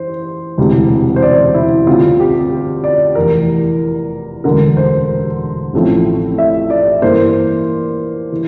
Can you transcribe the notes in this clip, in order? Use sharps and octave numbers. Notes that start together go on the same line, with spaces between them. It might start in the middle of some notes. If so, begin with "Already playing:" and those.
Already playing: E3 C5
E1 D2 C3 E3 G3
C5
D5
E4
D2 D3 G3 C4 F4
G4
D5
F1 E2 E3 A#4
E1 D2 D3 A#4
C5
A1 A2 F3 A3 C4
E5
D5
G2 E3 A#3 C5
E3